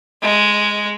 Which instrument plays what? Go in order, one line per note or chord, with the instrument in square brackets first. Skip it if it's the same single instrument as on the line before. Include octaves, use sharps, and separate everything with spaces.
[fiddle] G#3